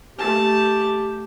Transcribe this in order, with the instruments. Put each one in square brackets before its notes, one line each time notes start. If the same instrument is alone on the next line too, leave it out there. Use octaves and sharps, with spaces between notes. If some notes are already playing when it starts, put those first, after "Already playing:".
[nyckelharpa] A3 A5 [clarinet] G4